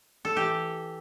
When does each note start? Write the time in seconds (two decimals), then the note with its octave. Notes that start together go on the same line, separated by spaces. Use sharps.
0.25 A4
0.36 E3 G4